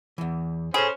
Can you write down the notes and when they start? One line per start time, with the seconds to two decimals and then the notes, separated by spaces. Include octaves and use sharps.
0.18 E2 E3
0.74 C#4 G#4 A4 C5 B5